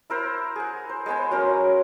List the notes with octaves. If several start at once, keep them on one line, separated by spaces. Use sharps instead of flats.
E4 A#4 C5
G#4 F#5
C5
G#3 B3 C5 G#5
F#3 C#4 A#4 C6
F#3